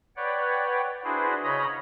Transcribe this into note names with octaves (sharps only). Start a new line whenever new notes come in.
B4 C#5 D5 F#5 G5
D4 E4 F#4 G#4 B4 C5
C#3 C#5 D#5 A#5 B5 D#6